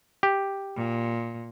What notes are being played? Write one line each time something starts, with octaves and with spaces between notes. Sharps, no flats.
G4
A#2